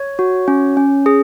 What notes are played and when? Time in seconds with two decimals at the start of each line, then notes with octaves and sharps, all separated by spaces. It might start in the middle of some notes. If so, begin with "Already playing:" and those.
Already playing: C#5
0.19 F#4
0.48 C#4
0.77 C#4
1.06 G#4